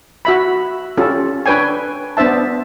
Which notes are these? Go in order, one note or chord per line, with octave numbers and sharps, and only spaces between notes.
F#4 E5 B5
C#4 F4 G4 A4
D4 B4 C#5 G5 G#5
B3 D4 C5 E5 A5